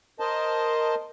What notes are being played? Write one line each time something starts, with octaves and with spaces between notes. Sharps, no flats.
A#4 C5 D#5 A5